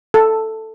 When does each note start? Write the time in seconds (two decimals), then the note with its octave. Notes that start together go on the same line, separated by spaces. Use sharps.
0.14 A4